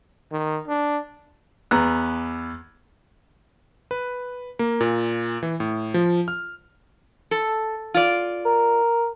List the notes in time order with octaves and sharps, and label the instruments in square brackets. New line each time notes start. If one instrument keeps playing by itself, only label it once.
[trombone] D#3
D4
[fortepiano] E2 B3 A#5 F#6
[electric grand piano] B4
A#3
A#2
E3
A2
F3
F6
[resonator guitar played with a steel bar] A4
F4 D5
[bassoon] A#4